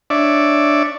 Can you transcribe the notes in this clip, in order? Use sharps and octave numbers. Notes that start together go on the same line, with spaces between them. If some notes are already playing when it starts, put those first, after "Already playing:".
D4 C#5 D5 E5